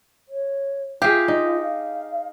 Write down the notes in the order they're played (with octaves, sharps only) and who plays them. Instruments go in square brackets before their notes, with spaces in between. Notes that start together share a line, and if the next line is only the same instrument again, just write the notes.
[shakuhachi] C#5
[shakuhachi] F4 [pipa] G4 [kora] G#4 E5 F5
[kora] D#4
[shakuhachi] F5